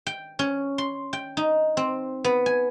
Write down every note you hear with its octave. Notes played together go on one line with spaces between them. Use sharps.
G5
C#4
C6
G5
D#4
C4
B3
G#5